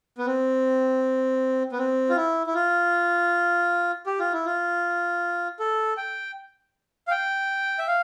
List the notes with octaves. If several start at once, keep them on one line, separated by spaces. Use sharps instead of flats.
B3
C4
B3
C4
F4
E4
E4
F4
G4
F4
E4
F4
A4
G5
F5
G5
E5
F5